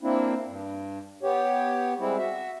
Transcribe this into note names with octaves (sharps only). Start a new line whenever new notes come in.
A#3 C4 D4 E4
G2
B3 G4 C#5
G3 G#3 C4 E4
F#4 E5